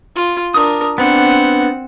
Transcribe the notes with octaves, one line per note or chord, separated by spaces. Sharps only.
F4
D4 A#4 D#6
B3 C4 D4 F#5